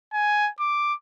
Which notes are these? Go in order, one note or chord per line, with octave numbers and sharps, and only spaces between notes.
G#5
D6